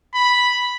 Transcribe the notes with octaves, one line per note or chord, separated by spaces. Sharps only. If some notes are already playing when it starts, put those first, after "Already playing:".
B5